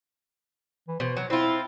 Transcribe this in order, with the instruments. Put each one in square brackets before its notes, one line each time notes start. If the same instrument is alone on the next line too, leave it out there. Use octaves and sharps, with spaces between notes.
[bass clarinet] E3
[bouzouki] B2 [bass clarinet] C5
[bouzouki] F#3
[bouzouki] C4 F4 [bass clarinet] E4